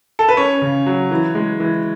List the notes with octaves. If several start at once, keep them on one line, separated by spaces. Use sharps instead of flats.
A4
B4
C#4 C#5
C#3
F#3
E3
G#3
E3